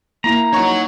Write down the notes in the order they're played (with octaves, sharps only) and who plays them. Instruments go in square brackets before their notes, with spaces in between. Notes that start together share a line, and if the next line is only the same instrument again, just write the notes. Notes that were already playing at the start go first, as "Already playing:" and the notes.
[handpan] A#3 E4 [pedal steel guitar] A#5
[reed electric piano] D#4 C#6 [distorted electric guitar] C#5 F#5